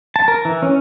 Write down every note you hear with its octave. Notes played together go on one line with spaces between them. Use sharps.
A5
A#4
E3
C#4